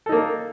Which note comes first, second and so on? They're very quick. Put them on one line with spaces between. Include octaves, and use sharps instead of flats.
A4 D#4 A#3